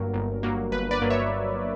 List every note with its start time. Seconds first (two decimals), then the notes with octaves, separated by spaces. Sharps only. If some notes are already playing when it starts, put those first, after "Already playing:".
Already playing: G1 G2 F#3 A#3 A#4
0.14 G1
0.43 G2 F#3 A#3
0.72 G1 B4
0.91 B4 D5
1.02 G2 F#3 A#3
1.10 C#5 E5